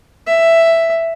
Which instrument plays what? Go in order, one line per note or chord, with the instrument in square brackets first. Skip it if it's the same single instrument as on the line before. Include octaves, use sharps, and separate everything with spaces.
[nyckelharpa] E5